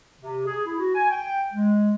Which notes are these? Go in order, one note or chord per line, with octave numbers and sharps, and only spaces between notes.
C3
G#4
E4
F#4
G#5
G5
G#3